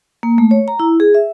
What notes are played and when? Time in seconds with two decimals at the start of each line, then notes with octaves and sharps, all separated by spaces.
0.23 A#3
0.38 A3
0.51 C#5
0.68 A#5
0.80 E4
1.00 G#4
1.14 E5